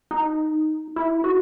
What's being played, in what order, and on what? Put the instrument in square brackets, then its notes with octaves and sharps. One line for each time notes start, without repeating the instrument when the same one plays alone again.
[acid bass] D#4
E4
F#4